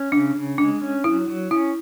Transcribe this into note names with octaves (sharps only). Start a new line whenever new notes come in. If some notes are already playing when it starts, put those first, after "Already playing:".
Already playing: C#4
C#3 D4
C#3
G#3 D4
C#4
F#3 E4
F#3
C#4 E4